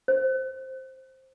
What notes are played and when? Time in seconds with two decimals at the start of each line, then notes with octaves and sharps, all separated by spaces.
0.08 C5